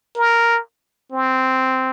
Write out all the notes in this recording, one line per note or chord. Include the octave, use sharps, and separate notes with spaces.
A#4
C4